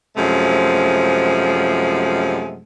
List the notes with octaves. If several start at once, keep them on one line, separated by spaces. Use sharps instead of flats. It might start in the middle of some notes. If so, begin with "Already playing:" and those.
F#2 C3 F3 G#3 A3